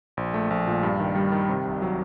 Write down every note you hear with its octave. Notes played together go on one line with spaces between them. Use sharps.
A#1
A3
A#1
A#2
G2
D#3
G3
D#3
C3
C2
F#3